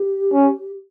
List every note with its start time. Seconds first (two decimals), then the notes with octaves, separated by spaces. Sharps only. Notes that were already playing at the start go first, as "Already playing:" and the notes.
Already playing: G4
0.33 C#4